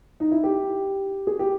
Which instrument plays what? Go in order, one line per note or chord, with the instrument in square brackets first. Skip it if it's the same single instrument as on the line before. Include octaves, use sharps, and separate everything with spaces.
[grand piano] D#4
E4
G4
G#4
G4